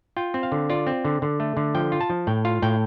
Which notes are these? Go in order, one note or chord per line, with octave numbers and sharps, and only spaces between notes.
F4 G5
C4
F5
D3
F4 D5
C4
D3
D3
A3
D3
F3 G5
F4
A5
F3
A2 G5
F4 F5
A2 G5